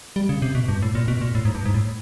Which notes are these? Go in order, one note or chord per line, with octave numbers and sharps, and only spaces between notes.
G3
C#3
C3
B2
G2
A2
A#2
B2
A#2
A2
G#2
G2
G#2
A2